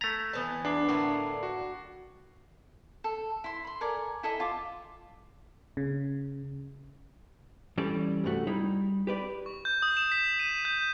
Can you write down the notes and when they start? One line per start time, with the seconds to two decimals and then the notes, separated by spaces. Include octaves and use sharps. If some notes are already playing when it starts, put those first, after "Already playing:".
0.01 A3 A#5 G#6 A6 B6
0.33 E3 B3 A5
0.65 E2 D4 D6 A6 C7
0.89 A2 D3 A#3 B3
1.43 F#4
3.04 A4
3.44 E4 C6
3.64 B5 C6
3.81 A4 A#4 D5 G#5
4.23 E4 A4 D#5 E5
4.40 F4 D6
5.77 C#3
7.77 E3 G3 C#4 A4 D5
8.24 C2 G2 A3 F#4
8.47 G3 D#4 E4
9.07 G4 B4 D5
9.46 C#6
9.65 G6
9.82 D#6
9.97 E7
10.12 B6
10.39 D#7
10.65 G6